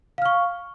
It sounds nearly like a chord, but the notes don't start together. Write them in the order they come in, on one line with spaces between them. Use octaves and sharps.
F5 F6 C#6